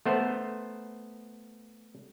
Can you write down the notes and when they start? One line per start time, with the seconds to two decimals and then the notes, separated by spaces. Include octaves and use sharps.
0.06 A3 B3 C5